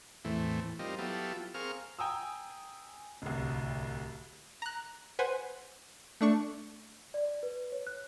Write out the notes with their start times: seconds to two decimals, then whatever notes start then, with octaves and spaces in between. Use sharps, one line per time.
0.25 E2 A2 E3 A3 C4
0.79 G3 C4 D#4 F4 A#4
0.99 F#3 B3 E4 F4 G4 A4
1.54 C4 G#4 A#4 F5 C#6 F6
1.99 G5 G#5 A#5 D#6 E6
3.22 D1 C2
4.62 A#5 F#6
5.19 B4 C5 F#5 G#5
6.21 A3 D4 C#6
7.14 D5
7.43 B4
7.72 C#5
7.87 F#6